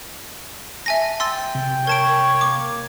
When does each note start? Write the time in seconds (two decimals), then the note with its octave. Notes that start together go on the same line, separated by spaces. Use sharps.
0.86 E5 G#5 A5 A#6
1.20 G5 C6 E6 A6
1.55 C3
1.87 A#4 C#5 A5 D7
2.41 A#3 D6